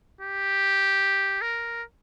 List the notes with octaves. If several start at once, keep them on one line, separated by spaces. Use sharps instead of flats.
G4
A#4